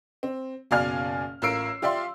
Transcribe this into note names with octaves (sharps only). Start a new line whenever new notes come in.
C4
F#1 B2 D5 F5 G#5 F6
A1 F4 A#4 E6 C7 D7
F4 G4 D5 E5 F5 C6